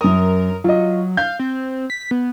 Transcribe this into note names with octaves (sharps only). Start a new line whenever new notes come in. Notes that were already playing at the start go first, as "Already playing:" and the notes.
F#2 A#4 D#6
F#3 F4 D#5
F5 G6
C4
B6
B3